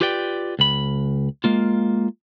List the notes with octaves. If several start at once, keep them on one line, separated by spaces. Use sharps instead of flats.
F4 G4 B4 D5 G5
C#2 B5
G#3 A#3 F4